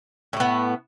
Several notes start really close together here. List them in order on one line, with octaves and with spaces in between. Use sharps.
A2 A3 B3